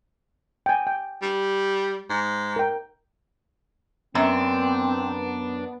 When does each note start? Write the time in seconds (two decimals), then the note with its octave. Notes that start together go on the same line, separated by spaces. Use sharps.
0.66 G5 G#5
0.87 G5
1.22 G3
2.10 G#2
2.56 A#4 G5
4.15 F#2 B3 C4 D4